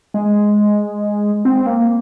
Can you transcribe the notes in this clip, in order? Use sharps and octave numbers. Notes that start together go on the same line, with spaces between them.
G#3
C4
A#3